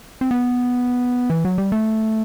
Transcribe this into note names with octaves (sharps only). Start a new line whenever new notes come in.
C4
B3
E3
F#3
G3
A3